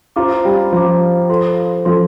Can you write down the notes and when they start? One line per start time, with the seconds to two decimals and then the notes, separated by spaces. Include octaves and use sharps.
0.16 F4 C5 F5 A#5 D6
0.45 G3
0.73 F3 C5 F5 A#5 D6
1.29 F4 A4 C5 F5 C6
1.85 F3 F4 A4 C5 F5 C6